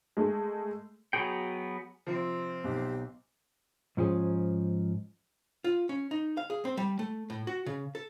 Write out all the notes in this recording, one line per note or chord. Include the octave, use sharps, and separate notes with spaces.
G#3 A3
F#3 B3 F#4 G#4 G5
C3 F3 C4
B1 G4
G#2 F3 C#4 G#4
F4
C#4
D#4
F5
G#4
C4
G3
A3
A2
F#4
C#3
A4